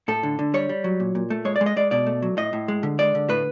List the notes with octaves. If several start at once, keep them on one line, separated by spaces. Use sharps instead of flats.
A2 A4
D3
D3
G3 C#5
G3
F#3
A#2
A#2
A3
G#3 C#5
D5
G#3
D#5
G#3 D5
B2 D5
A3
F#3
A2 D#5
A2
G#3
D3
G#3 D5
D3
A2 B4